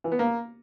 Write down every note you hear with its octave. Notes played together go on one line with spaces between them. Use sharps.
E3
B3
A#3